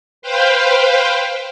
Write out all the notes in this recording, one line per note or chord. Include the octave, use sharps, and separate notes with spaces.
B4 C5 F5 G5